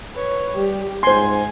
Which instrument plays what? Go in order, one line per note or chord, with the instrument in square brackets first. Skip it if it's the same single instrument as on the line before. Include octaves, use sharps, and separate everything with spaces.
[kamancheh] B4 C#5
[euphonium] G3 [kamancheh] G4
[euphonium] G#2 [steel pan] C5 C6 [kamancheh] G#5